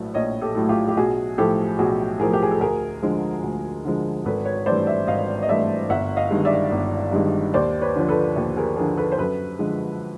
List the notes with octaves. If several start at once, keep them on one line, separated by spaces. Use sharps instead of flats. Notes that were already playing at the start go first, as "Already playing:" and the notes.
Already playing: A#1 A2 F#3 A3 B4
A#1 C#5 D#5
G4 A4
A2 F#3 A3
F4 G4
G4
B1 F#4 G#4
A2 F3 G4 A4
B1 F#4 G#4
A2 F3 G#4 A#4
G4
G#4
A4
D2 G#4 A#4
D3 F3 G#3
D2
D3 F3 G#3
G#1 A4 B4
B4 C#5
G2 E3 A3 C5 D5
D5 E5
G#1 D#5 F5
D#5
G2 E3 A3 D5 E5
G1 E5 F#5
D#5 F5
G2 D#3 G#3
D5 E5
G1
G2 D#3 G#3
D#2 C5 D5
B4 C#5
D3 F3
A4 B4
D#2
G#4 A#4
D3 F3 G#4 A#4
A4 B4
C5
F#2 A4 B4
D3 F3 G#3